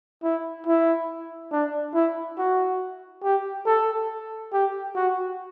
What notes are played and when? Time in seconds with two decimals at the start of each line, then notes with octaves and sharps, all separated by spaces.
0.23 E4
0.67 E4
1.52 D4
1.94 E4
2.38 F#4
3.23 G4
3.66 A4
4.53 G4
4.95 F#4